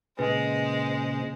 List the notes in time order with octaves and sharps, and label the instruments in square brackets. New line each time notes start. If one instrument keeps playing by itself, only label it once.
[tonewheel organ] A#2 C#3 [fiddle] G#3 C5 [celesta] B4